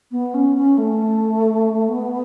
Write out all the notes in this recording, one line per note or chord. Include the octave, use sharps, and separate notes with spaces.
B3
C#4
C#4
A3
B3